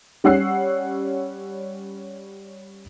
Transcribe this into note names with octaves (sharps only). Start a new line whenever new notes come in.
G3 C#4 F#5 E6 F#6 C7